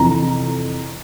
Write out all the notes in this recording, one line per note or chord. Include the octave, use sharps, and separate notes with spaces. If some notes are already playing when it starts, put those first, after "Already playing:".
Already playing: F2 C3 E3 A#5